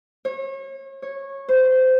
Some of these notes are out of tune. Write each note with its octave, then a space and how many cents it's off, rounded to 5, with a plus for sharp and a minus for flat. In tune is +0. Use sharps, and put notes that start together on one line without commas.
C#5 -35
C#5 -15
C5 -20